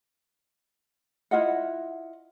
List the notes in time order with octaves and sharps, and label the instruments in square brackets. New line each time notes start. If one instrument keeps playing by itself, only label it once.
[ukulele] E4 F4 D#5 F#5